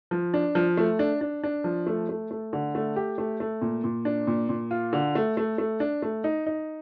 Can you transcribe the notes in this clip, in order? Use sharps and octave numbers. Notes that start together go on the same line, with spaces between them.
F3
D4
F3
A3
D4
D4
D4
F3
A3
A3
A3
D3
A3
G4
A3
A3
A#2
A#2
D4
A#2
A#2
F4
D3
A3
A3
A3
D4
A3
D#4
D#4